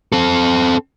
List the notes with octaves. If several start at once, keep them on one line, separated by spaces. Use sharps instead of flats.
C4 A4